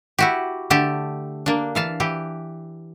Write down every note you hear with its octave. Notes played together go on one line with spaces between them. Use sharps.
E4 F#4 G4
D3 A3 G4 A5
A#3 D4
E3 F5 A5
E3 G4